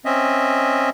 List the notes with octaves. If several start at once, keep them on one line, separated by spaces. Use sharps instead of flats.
C4 C#4 D#5 E5